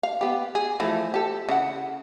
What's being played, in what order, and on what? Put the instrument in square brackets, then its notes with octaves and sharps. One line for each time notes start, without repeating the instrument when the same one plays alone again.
[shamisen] F5
B3 G4
G#4
E3 F3 A3
G4 A4
C#3 E4 F#5